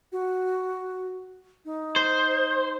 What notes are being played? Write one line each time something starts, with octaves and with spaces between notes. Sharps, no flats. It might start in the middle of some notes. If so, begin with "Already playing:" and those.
F#4
D#4
C5